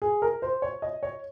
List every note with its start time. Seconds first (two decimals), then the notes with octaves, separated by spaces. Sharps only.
0.02 G#4
0.22 A#4
0.42 C5
0.62 C#5
0.82 D#5
1.03 C#5